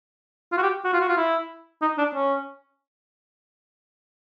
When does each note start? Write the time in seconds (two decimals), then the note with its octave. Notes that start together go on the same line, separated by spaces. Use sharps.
0.52 F4
0.58 F#4
0.63 G4
0.84 F#4
0.93 F4
1.01 F#4
1.09 F4
1.17 E4
1.82 D#4
1.98 D4
2.15 C#4